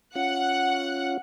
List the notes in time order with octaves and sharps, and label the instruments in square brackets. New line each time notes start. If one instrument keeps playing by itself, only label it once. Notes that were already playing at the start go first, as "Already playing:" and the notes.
[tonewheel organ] C#4 F4 [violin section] F#5 F#6